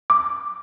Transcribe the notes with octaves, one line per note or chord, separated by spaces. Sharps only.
D6